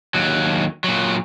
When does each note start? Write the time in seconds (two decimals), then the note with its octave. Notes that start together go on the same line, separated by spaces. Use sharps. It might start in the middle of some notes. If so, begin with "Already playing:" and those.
0.15 D#2 F#3
0.84 A#2 F#3